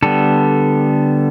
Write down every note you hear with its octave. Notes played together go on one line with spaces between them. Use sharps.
D3 G3 B3 A4